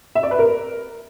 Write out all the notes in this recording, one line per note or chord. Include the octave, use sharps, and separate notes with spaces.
E5
D5
B4
A#4